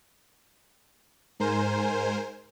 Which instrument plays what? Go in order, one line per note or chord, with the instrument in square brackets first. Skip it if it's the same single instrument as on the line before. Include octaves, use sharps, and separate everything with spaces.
[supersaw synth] G#2 A#4 C5 G#5